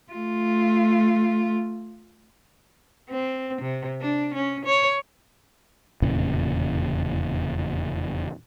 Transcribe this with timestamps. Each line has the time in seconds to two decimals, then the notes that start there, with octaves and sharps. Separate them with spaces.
0.13 A3 F4
3.09 C4
3.62 C3
4.01 D4
4.34 C#4
4.66 C#5
6.02 F1 E2 A#2 C#3